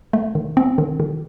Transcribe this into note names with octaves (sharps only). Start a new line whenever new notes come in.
A3
D#3
C4
D#3
D#3